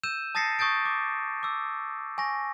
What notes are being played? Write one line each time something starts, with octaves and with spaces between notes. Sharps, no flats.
E6 G6 D#7 E7
A5 D#6 A6 A#6 C7 C#7
C#6 D#6 G6 A6 D7
D6
D6 E6
G#5 C#6 A#6